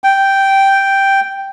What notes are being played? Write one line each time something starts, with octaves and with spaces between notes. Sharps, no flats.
G5